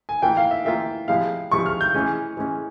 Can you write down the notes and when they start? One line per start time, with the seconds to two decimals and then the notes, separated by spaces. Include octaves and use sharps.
0.09 G#5
0.22 E3 A#3 F4 G5
0.37 F5
0.51 E5
0.65 E3 A#3 F4 E5
1.08 C3 F3 G#3 E4 F5
1.51 C3 F3 G#3 E4 C#6
1.66 F6
1.81 G6
1.95 E3 G#3 C#4
2.37 E3 G#3 C#4